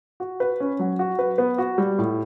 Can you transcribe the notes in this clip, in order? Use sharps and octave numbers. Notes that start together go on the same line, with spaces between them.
F#4
B4
C#4
F#3
F#4
B4
B3
F#4
G3
A2